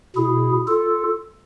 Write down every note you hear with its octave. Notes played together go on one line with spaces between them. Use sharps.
B2 E4 G#4
F4 A4